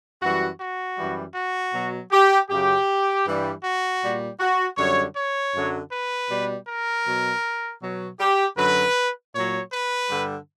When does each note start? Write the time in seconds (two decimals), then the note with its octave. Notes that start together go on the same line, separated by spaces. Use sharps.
0.21 F#2 E3 G3 F#4
0.60 F#4
0.97 F#2 E3 G3
1.35 F#4
1.73 B2 F#3
2.12 G4
2.49 F#2 C#3 F#3 G4
3.25 G2 E3 G3
3.63 F#4
4.02 A#2 G3
4.40 F#4
4.77 F#2 D3 G3 C#5
5.16 C#5
5.53 F#2 D3 F#3
5.91 B4
6.29 B2 G3
6.67 A#4
7.05 B2 F#3
7.81 B2 F#3
8.19 G4
8.57 F#2 D3 F#3 B4
9.33 A#2 F#3 C#5
9.71 B4
10.09 G2 D3 G3